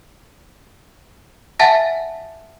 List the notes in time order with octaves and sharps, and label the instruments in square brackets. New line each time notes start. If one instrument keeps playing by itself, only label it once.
[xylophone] E5 F#5 G#5 A5 A6 A#6